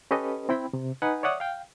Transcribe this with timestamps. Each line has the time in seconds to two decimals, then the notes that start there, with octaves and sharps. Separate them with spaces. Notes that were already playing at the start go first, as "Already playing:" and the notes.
0.11 C#4 G4 A4 B4 D#5
0.49 C4 E4 G5 B5
0.73 C3
1.02 D#4 B4 F#5 G#5
1.23 C#5 D5 E5 F#5 D#6
1.40 F5 G5